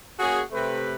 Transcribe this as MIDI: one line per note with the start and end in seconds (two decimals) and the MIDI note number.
0.19 0.41 58
0.19 0.41 61
0.19 0.41 66
0.19 0.41 68
0.52 0.95 48
0.52 0.95 57
0.52 0.95 71